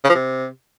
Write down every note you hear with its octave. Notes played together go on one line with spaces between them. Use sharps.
C#3
F3
C3